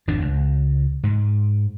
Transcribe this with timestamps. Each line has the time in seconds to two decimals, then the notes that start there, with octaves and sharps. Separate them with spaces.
0.08 G#1 F2 B2 D4
0.22 C#2
1.03 G#2